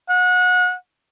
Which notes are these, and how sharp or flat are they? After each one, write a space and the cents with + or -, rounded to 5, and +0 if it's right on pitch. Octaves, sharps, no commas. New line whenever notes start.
F#5 -30